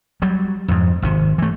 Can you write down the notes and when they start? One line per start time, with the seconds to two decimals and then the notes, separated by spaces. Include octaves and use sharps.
0.22 F#3 G3
0.68 F2 G#2
1.02 G#1 C3
1.38 E3 A3